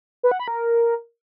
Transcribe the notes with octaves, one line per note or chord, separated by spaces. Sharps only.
B4
F#5
B5
A#4